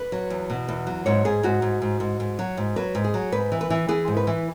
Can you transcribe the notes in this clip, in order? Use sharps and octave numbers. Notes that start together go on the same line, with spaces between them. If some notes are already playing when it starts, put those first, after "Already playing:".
Already playing: B4
F#3
E2
B2
E2
F#3
G#2 C#5
G#2 G#4
G#2 F#4
G#2
G#2
G#2
G#2
F#3
G#2
F#3 B4
G#2
G#4
F#3
G#2 B4
E3
B4
E3
E3 G#4
G#2
B4
E3